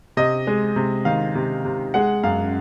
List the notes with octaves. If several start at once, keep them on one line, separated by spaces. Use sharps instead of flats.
C3 D#5
G#3
C3
D#3 F5
C3
C3
G#3 F#5
F#2 F5